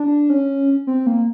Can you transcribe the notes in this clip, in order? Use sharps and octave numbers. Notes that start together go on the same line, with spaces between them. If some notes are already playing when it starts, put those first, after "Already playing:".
Already playing: D4
C#4
C4
A#3